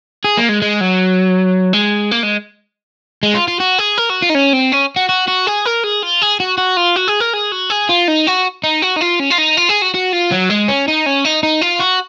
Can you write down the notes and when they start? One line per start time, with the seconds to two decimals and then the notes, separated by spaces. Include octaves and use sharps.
0.24 G#4
0.37 A#3
0.49 G#3
0.62 G#3
0.81 F#3
1.73 G#3
2.11 A#3
2.23 G#3
3.23 G#3
3.35 F4
3.48 F4
3.60 F#4
3.78 G#4
3.98 A#4
4.10 F#4
4.22 F4
4.30 D#4
4.35 C#4
4.53 C4
4.72 C#4
4.96 F#4
5.09 F#4
5.28 F#4
5.47 G#4
5.65 A#4
5.84 G#4
6.02 F4
6.22 G#4
6.40 F#4
6.58 F#4
6.77 F4
6.96 F#4
7.08 G#4
7.20 A#4
7.34 G#4
7.52 F#4
7.70 G#4
7.89 F4
8.08 D#4
8.27 F#4
8.64 D#4
8.82 F#4
8.96 D#4
9.01 F4
9.19 C#4
9.30 F4
9.38 D#4
9.57 F4
9.69 G#4
9.82 F#4
9.95 F#4
10.13 F4
10.32 F#3
10.50 G#3
10.68 C#4
10.88 D#4
11.06 C#4
11.25 D#4
11.43 D#4
11.62 F4
11.80 F#4